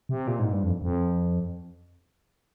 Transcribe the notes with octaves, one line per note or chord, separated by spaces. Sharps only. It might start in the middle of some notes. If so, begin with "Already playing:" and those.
C3
A#2
G#2
G2
F2
F2